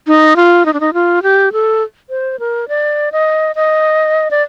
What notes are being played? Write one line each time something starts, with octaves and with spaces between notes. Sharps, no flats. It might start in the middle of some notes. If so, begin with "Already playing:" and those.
D#4
F4
D#4
D4
D#4
F4
G4
A4
C5
A#4
D5
D#5
D#5
D5